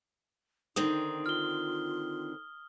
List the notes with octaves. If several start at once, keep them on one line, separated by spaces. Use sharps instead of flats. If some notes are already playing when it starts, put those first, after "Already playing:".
D3 D#3 C4 D#4 D#6
F4 F6 G7